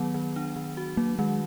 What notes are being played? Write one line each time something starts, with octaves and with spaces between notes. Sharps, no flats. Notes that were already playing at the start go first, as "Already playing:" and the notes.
Already playing: D#3 F#3 B3
D#3
D4
D#3
F#4
F#3 A#3
D#3 G#3